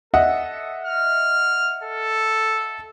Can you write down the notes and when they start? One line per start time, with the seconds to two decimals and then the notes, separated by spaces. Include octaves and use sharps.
0.14 A4 D#5 E5 F#5
0.85 F6
1.84 A4